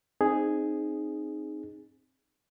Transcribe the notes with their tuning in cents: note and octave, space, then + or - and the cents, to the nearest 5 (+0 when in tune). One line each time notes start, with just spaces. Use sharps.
C4 +10 D#4 -15 G#4 +0